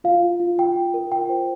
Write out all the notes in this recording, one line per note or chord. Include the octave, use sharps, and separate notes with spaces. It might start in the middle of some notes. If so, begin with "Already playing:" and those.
F4 F5
F4
F4
F4 G5
F4
A#4
F4 G5
C5